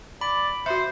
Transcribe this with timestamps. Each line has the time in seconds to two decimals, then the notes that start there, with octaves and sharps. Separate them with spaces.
0.21 D5 B5
0.66 F#4 C5 E5